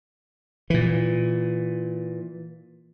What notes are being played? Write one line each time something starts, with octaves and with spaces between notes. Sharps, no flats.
A#2 E3